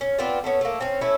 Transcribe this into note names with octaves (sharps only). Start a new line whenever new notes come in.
C#4
B3 C4 F4 D5
A3 B3 C#4
A3 A#3
C4 C#4
A3 C#4 E4 A4